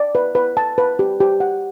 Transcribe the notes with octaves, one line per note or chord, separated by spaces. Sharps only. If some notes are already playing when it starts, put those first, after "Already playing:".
Already playing: D5
B4
B4
A5
B4
G4
G4
F#5